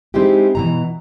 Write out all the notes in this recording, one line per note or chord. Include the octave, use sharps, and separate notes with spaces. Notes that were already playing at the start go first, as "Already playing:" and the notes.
G#3 C4 D#4 E4 G4
B2 E3 A#5